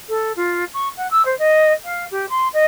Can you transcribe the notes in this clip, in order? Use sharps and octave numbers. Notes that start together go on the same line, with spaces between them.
A4
F4
C#6
F#5
E6
C5
D#5
F5
G4
C6
D#5